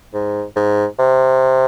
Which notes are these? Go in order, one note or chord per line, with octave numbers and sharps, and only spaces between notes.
G#2
G#2
C3